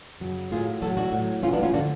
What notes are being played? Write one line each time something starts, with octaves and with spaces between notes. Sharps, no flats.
F#2 C#3 F#3
A2 F#3 F4 G#4
A2 F#3 F#4 A4
D4 F#4
A2 F#3
A2 F#3 C#4 F4
B3 D4
C#4 F4
D3 F3 D4 F#4